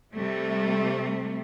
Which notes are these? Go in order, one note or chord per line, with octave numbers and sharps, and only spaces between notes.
C3 G3 A3